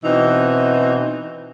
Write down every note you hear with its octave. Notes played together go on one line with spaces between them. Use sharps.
B2 E3 C4 D#4